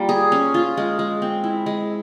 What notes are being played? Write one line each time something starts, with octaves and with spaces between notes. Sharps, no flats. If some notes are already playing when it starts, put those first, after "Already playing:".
Already playing: G3 A#3 F4
G#4
C#4
F4
G#3
G#3
C4
E4
G#3